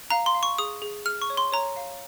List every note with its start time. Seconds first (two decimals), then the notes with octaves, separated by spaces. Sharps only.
0.10 F5 A#5
0.26 C6
0.35 F5
0.43 C#6
0.58 G#4 D#6
0.82 G#4
1.06 G#4 F6
1.22 C#6
1.30 C#5
1.37 C6
1.52 C#5 A#5
1.76 F5